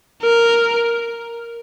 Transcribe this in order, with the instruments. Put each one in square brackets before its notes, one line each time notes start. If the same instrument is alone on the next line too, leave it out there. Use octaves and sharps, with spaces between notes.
[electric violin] A#4